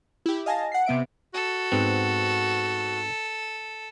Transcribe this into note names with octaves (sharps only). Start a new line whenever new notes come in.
E4 G4
D#5 F5 G#5 A5 A6 A#6
F#5 C7
C3 B3 E5 D7
F#4 A4
G#2 B3 C4